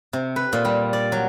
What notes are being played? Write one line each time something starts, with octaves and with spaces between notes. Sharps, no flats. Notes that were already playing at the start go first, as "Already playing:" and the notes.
C3
B4
A#2
G3
D5
F#3